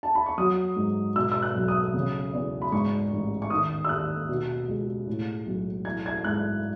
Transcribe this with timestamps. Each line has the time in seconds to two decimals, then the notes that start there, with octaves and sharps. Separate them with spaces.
0.03 A5
0.15 B5
0.26 C#6
0.38 F#3 D#6
0.76 G#2
1.16 B2 E6
1.32 E6
1.42 F#6
1.55 B1
1.68 D#6
1.94 C#3
2.33 E2
2.62 B5
2.72 G#2 C#6
3.12 A1
3.42 C#6
3.50 D#3 D#6
3.85 E6
3.89 D#2 F#6
4.29 B2
4.68 C#2
5.07 A2
5.46 B1
5.85 E3 G#6
6.06 G#6
6.24 G#2 F#6